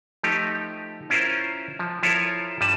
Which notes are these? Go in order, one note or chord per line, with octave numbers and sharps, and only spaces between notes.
F3 A3 D#4 G4
C#4 E4 F4 A#4 C5
F3
F3 E4 F4 A4 A#4 C#5
G2 G3 B4 A5